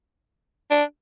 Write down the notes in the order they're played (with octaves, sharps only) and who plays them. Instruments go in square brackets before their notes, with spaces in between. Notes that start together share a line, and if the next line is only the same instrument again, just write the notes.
[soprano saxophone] D4